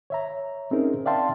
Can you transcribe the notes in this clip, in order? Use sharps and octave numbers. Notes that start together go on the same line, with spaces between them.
C#5 E5 A#5
C4 C#4 D#4 G#4 A#4
D5 E5 F5 G5 A5 C6